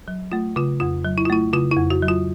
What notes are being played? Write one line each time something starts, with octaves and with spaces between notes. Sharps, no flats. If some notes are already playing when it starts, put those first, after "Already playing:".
F#3
A3 F4
C#3 F4
F2 F4
F#3
E4
F4
A3 E4
C#3 F4
E4
F2
F#4
F#3
F4